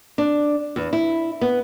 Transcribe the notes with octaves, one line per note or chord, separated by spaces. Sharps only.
D4
E2
E4
B3